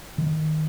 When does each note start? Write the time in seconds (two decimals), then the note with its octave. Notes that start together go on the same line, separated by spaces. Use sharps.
0.18 D#3